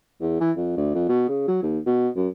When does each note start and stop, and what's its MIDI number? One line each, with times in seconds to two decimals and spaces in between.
0.21 0.38 40
0.40 0.52 52
0.57 0.72 41
0.77 0.92 38
0.94 1.04 41
1.09 1.25 47
1.29 1.46 49
1.48 1.58 54
1.62 1.79 39
1.86 2.09 47
2.16 2.28 42